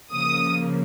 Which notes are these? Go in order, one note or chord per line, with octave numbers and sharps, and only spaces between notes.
C#3 F3 A#3 D#6